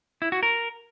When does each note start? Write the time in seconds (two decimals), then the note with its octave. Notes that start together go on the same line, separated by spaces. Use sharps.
0.22 E4
0.32 F#4
0.43 A#4